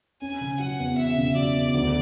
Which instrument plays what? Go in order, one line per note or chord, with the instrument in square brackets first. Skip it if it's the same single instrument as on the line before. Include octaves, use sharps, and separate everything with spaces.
[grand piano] C#4 [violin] G#5
[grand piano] C#3
[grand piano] F#3 [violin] F#5
[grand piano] E2
[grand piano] C#4 [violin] E5
[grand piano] C#3
[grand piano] F#3 [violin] D5
[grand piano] E2
D2